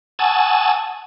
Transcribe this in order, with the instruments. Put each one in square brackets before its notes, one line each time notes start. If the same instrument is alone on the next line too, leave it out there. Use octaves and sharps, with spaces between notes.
[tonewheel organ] F#5 G#5 A5 C#6 D#6 E6